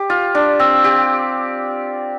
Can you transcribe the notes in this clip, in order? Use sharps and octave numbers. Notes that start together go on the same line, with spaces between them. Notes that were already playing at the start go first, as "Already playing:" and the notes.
Already playing: G4
F4
D4
C4
G4